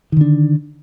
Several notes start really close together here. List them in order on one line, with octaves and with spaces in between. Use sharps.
D#3 D3 D4